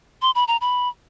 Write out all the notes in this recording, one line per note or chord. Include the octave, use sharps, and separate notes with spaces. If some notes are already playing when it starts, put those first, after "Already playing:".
C6
B5
A#5
B5